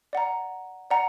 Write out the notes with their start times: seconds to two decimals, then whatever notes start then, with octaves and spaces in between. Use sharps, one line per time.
0.13 D5 F#5 A#5
0.90 D5 F#5 A#5